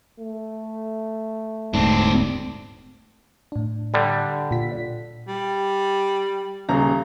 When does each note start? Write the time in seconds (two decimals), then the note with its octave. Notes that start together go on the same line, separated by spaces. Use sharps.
0.19 A3
1.74 D#1 D2 G#2 C4 D4
3.52 A2 D4
3.94 D3 G3
4.51 A#2 F4 B6
5.28 G3
6.69 D#1 C#3 A#5